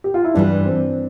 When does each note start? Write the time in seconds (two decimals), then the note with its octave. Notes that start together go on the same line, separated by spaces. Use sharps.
0.04 G4
0.14 F4
0.25 E4
0.35 G2 E3 G3 D4
0.66 C4